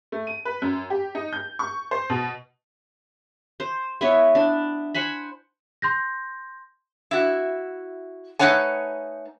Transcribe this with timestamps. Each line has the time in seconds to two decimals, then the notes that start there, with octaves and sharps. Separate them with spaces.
0.12 A3
0.27 D#7
0.45 B4
0.62 F#2
0.90 G4
1.15 D#4
1.33 G6
1.59 C#6
1.91 C5
2.10 B2
3.60 C5
4.01 B3 E4 C#5
4.35 D4
4.95 C5 F#5 G#5 B5
5.82 C6 G6 A#6
7.11 E4 F#4
8.39 A3 D#4 B4 C#5 F#5 G#5